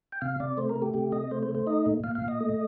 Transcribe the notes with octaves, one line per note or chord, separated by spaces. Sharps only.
G5
C3 F5
C3 D5
A3 C5
A#4
A3
G4
C3 G4
C3 D#5
A3 C5
C5
A3
C5
D#4 D#5
A#2
A#2 F5
F5
A#2
D#5
A3